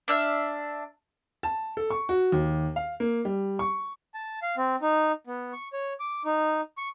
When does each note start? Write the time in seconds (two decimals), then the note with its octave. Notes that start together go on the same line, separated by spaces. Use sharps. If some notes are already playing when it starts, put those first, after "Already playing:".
0.08 D4 E5 F6
1.43 A5
1.77 A4
1.90 C#6
2.09 F#4
2.32 D#2
2.76 F5
3.00 A#3
3.25 G3
3.59 C#6
4.14 A5
4.42 F5
4.57 C4
4.82 D#4
5.27 B3
5.53 C#6
5.73 C#5
6.00 D6
6.25 D#4
6.78 C#6